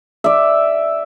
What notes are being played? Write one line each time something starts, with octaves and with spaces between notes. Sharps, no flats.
D5 E5